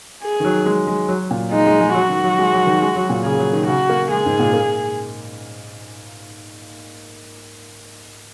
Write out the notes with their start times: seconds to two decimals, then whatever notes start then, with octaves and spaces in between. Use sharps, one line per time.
0.23 G#4
0.40 D#3
0.45 F#3
0.66 G#3
0.87 G#3
1.09 F#3
1.31 A#2
1.52 G#3 D#4
1.67 G#3
1.81 G#3
1.94 F#3 F#4
2.09 D#3
2.24 F#3
2.38 G#3
2.53 F#3
2.66 D#3
2.82 G#3
2.96 F#3
3.10 A#2
3.24 C#3 G#4
3.38 F#3
3.53 D#3
3.67 C#3 F#4
3.89 A#3
4.10 G#3 G#4
4.26 G#2
4.39 A#2
4.53 A#3